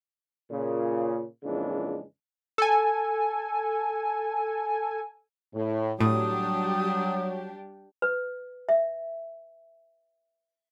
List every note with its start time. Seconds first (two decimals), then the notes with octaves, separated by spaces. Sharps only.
0.50 A#2 C#3
1.44 F2 A#2 C#3 E3 G#3 D4
2.58 A4 G#5
5.54 A2
6.01 A2 F#3 G3 D4 G4 D#6
8.02 B4
8.69 E5